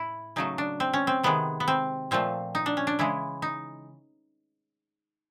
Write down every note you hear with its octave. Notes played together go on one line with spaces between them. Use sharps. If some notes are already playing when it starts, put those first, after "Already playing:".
Already playing: A2 E4
C#3 F#3 A3 D#4
D4
C4
C#4
C4
C3 D#3 G#3 B3
B3
C4
A#2 F3 A3 C4
D#4
D4
C#4
D4
C#3 E3 G#3 E4
D#4